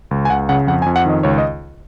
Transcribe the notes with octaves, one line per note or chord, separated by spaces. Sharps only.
C#2
G#5
C#2 F#5
C#3 F#5
F2 F#5
G#5
F2
F#5
D#3 D#5
C#2 C#5
D#5